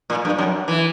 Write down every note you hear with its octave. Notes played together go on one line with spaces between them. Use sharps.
A#2
G2
F#2
E3